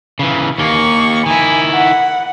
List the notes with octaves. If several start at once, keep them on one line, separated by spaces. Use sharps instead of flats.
C#3 E3
D#2 A#3 C#6
D#3 E4 G#5
F#5